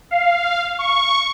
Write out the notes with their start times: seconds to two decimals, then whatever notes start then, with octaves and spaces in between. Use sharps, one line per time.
0.11 F5
0.79 C#6